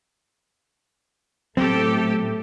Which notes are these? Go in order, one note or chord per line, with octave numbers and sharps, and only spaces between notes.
A2 F#3 A3 B3 C4 G4 A4